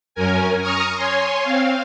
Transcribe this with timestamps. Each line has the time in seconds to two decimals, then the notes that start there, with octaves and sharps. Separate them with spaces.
0.15 F#2 C#4 A#4 G#5
0.61 A#5 C#6 D#6 F6
0.95 C#5 G#5 C6
1.42 C4 F5